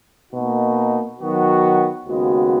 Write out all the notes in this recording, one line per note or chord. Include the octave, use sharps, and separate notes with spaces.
B2 A#3 D#4 F#4
D#3 F#3 B3 F#4
D#2 C#3 G#3 B3 F#4